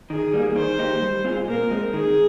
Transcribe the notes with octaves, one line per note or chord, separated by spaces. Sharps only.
D#3 G#4
G3 A#3
D#3 C5
A#3 D#4 G4
G3
C4 F4 G#4
A#2 A#4
G#3 C4
D#3 G#4